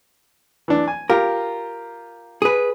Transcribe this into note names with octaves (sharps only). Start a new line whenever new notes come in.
E3 D4
G#5
F4 G4 A#4
G#4 B4